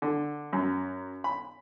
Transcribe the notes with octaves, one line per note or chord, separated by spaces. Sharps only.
D3
F#2
B5